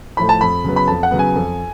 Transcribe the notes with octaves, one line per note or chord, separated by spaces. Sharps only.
A2 F3 A3 B5
A5
F2 B5
C#3 F#3 B3
B5
F2 A5
F#5
C#3 F#3 B3
G#5
F2